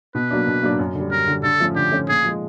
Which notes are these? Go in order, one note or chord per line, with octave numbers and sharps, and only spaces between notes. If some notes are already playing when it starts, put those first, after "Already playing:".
B2 B4
F#3 A#3 D4
B2
F#3 A#3 D4
F#2
D3 G3
F#2 A#4
D3 G3
D3 A4
F3 A3 C#4
D3 G4
F3 A3 C#4
A#2 G#4
F3 G#3